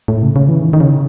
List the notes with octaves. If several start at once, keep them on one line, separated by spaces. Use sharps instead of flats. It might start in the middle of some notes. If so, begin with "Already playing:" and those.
A2
C#3
C#3
E3
D#3
D#3
C#3